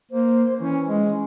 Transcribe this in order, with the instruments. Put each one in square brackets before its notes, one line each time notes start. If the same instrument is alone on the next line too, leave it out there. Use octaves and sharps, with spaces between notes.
[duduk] A#3 [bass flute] C5
[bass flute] E3 [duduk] C#4
[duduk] G#3
[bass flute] C#4